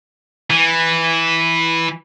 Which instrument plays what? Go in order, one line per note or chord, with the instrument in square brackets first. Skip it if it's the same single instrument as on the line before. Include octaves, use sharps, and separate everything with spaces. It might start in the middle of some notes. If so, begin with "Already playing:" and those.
[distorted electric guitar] E3